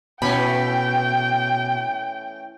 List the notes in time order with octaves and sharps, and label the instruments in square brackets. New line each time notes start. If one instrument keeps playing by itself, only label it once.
[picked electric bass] B2 [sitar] E3 A3 C#4 [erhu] G5 [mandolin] B5